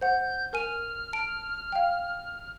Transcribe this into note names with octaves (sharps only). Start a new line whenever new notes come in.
C5 F#5 G6
A#4 G#5 F6 D#7
A5 D7
F5 G5